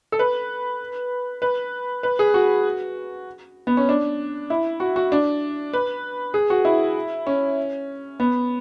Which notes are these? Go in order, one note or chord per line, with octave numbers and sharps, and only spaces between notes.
A4
B4
B4
B4
G#4
F#4
B3
C#4
D4
E4
F#4
F#4
D4
B4
G#4
F#4
E4
C#4
B3